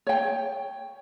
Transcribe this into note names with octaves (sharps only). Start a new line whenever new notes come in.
C#5 G5